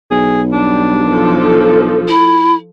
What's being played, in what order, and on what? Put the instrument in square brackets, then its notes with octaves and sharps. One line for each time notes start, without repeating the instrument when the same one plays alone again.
[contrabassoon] B1 [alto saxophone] G#4
[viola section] G3 [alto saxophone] D4
[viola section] F3 A4
[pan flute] E4